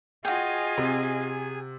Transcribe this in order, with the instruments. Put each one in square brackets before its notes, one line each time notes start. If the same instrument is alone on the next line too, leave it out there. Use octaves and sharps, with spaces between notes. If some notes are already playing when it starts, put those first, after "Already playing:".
[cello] F4 D#5 [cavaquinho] F#4 G5 [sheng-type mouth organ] G#4 G#5
[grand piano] C3